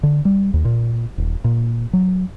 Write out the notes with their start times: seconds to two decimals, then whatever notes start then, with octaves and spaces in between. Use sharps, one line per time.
0.03 D3
0.25 G3
0.54 D#2
0.65 A#2
1.18 D#1
1.44 A#2
1.93 F#3